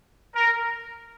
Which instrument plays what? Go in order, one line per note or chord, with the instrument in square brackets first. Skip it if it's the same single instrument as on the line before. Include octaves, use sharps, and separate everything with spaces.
[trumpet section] A#4